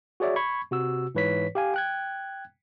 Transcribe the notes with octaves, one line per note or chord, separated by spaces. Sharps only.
F#4 G#4 C#5 D5 E5
B5 C#6 G#6
C3 F#4 E6
G#2 E3 B4 C#5 B6
G4 F5 G#5
G5 F#6 G#6